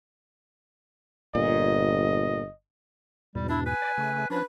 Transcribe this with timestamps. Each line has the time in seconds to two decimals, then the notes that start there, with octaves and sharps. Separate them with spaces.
1.35 G1 A#2 D#5
3.35 E2 G#2 B2 G3
3.49 D4 E4
3.66 B4 G#5
3.82 D5
3.97 C#3 A3
4.30 F3 C#4 D4 B4